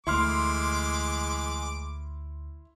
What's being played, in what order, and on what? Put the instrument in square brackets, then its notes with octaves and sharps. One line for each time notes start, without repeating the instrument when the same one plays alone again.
[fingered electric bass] D2 A3 [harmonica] E3 G#3 D6 [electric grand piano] E4 C6 F6